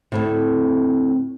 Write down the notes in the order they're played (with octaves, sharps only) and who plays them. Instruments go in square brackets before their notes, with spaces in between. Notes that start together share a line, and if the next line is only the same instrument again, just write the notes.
[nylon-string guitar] D2 A2 C3 [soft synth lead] C4